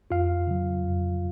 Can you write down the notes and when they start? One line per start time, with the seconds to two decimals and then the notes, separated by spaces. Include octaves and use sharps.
0.10 F2 F4 F5
0.47 C#3 F#3
0.83 F2